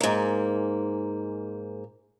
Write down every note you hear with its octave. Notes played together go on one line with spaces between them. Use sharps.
G#2 A#3